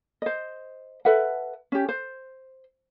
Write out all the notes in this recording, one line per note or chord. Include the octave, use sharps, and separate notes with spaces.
C5 D#5
A4 B4 E5 F#5
C#4 G4
C5